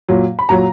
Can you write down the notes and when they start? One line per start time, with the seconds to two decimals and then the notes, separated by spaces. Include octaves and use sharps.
0.09 A#2 F#3
0.39 B5
0.49 A#2 F#3 A#5